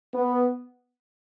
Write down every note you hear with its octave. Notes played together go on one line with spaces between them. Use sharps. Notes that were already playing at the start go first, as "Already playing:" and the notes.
B3